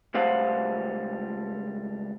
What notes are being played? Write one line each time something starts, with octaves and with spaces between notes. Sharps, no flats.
C#2 G3 A3 C5 F5 F#5